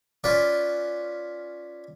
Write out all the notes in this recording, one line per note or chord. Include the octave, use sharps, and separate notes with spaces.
C#4 F4 B4 D5